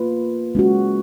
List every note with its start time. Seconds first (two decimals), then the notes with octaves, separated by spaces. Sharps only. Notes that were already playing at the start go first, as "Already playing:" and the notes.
Already playing: A#3 F4 B4
0.55 G#3 C#4 F#4